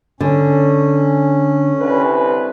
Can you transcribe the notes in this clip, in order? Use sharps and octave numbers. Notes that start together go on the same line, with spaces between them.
D3 C#4
C2 B4